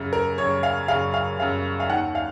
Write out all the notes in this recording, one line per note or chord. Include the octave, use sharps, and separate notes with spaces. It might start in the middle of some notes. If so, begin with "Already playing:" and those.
Already playing: F#2 C#3
A#4
F#2 C#3 C#5
F5
F#2 C#3 F5
F5
F#2 C#3 F5
F5
D#2 D#3 F#5
F5